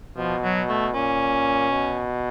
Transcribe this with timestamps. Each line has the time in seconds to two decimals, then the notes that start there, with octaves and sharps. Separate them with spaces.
0.18 B2 F3
0.44 F#3
0.69 A3
0.94 A#2 C#4
1.71 B2